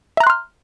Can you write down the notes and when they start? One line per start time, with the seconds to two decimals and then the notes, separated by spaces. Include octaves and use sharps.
0.17 E5
0.20 A#5
0.24 F#6
0.27 C6
0.30 F6